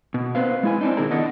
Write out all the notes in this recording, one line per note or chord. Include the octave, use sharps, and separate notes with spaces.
B2
C4 B4 C5 F5
G#3 E4 G#5
C4 D4 D#4
B2 D#3 C4 E4 G#4 A#4
B3 D4 D5 D#5 F#5